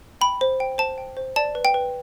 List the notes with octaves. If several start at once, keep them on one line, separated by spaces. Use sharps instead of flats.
G5 B5
C5
G5
C5 A5
G5
C5
D5 A5
B4
G5
B4